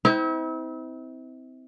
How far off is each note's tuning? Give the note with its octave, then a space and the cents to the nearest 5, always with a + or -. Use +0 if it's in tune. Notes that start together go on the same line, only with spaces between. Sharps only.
C4 -20 E4 -40